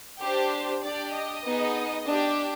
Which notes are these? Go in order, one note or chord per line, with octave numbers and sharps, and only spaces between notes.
D4 G4 C5
D4 G4 D5
D#5
B3 D#4 G#4
D4 G4